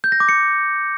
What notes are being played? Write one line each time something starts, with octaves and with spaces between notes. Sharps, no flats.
G6
A#6
D6
C#7